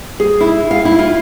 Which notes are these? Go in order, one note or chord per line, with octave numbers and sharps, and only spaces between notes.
G#4
E4
F5
E4
F4